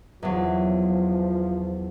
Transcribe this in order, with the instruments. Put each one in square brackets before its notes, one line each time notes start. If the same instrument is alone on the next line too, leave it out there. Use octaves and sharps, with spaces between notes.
[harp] E2 F#3 [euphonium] F3